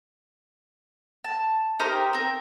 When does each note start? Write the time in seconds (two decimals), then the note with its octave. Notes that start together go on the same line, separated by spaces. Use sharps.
1.24 A5
1.79 D#4 G4 A#4 C5
2.13 C4 A#4